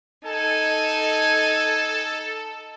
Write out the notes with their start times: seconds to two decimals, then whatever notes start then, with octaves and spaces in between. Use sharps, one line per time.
0.24 D#4 A4 G#5